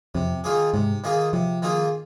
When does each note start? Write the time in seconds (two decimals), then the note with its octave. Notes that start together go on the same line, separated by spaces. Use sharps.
0.15 F2 C3
0.44 D#3 A#3 F4 G#4
0.74 G#2 C3
1.04 D#3 A#3 F4 G#4
1.33 C3 F3
1.62 D#3 A#3 F4 G#4